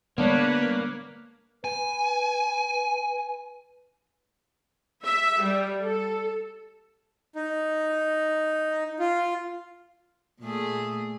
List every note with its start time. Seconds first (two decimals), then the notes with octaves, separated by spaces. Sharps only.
0.18 D3 G3 G#3 A#3 B3 D4 B4 C#5
1.64 B4 G#5
5.04 E5
5.41 G3
5.83 A4
7.35 D#4
8.99 F4
10.41 A#2 A3 G#4